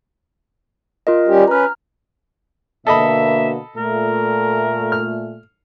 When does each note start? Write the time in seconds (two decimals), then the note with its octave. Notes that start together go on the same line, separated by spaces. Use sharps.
1.07 F4 A#4 D#5
1.28 G3 C#4 G4
1.48 C#4 B4 A#5 F6
2.87 B2 D3 A#3 A4 D#5 E5 B5
3.76 A#2 A3 A#4
4.92 F6